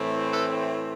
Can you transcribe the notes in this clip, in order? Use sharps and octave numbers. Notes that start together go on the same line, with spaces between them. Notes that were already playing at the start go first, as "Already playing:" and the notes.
Already playing: A2 E3 A3 C4
A4 B4